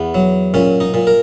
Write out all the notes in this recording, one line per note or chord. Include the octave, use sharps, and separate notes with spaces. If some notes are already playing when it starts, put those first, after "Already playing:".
Already playing: E2 B3
F#3
A#2 C#4
D#4
A#2
A#4